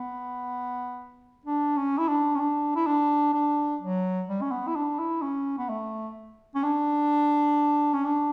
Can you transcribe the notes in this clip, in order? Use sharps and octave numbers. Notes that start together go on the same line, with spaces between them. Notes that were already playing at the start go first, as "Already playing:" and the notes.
Already playing: B3
D4
C#4
E4
D4
C#4
D4
E4
D4
D4
F#3
G3
C#4
B3
E4
D4
E4
C#4
B3
A3
C#4
D4
C#4
D4